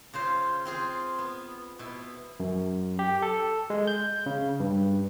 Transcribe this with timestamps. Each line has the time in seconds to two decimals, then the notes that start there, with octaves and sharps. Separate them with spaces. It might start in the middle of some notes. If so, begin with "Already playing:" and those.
0.14 C#3 F4 C5
0.65 C4 F4 G#4
1.18 B3
1.79 B2 E4
2.40 F#2
2.99 G4
3.22 A4
3.70 G#3
3.87 G6
4.26 C#3
4.60 G2